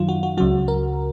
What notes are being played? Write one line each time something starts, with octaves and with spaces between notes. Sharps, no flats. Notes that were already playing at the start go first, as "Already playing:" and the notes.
Already playing: F#2 D#3 F#3 F4
F#4
F#4
C#2 C#3 F#3 F#4
A#4